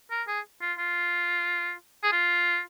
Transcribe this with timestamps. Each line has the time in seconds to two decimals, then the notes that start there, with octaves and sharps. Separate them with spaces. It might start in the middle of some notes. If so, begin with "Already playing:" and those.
0.11 A#4
0.28 G#4
0.61 F4
0.78 F4
2.03 G#4
2.12 F4